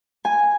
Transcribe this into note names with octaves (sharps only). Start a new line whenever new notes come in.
G#5